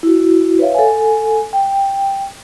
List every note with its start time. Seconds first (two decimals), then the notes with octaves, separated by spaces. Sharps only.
0.03 E4 F#4
0.59 B4 C#5 E5 F5
0.75 A4 F#5 G#5
1.53 G5